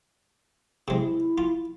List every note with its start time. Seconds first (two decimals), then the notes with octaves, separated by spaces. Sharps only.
0.88 C3 G#3 E4
1.38 F4